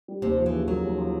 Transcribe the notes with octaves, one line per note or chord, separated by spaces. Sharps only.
G3
D#2 C3
F3
E3
C#3
F#3 A#3
D#2
F3